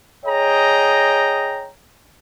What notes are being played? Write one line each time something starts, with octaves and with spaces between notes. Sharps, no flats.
G#4 C#5 D#5 G5 A#5